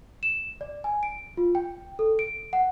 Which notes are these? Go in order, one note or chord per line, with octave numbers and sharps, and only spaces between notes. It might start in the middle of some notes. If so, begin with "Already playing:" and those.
E7
D5
G#5
D7
F4
G5
A4
D7
F#5